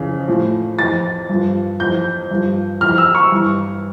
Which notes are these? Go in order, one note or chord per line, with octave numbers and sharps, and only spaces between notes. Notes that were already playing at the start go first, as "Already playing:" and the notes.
Already playing: F2 C#3 E3
A2 F3
F2 E3 A6
G2 F3
F2 E3 G6
G2 F3
F2 E3 F6
E6
C#6
G2 E3